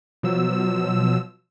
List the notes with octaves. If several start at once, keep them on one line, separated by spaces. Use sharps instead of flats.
B2 F3 F#3 E6